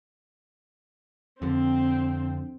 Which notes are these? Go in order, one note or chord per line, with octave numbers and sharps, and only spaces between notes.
F2 D3 C4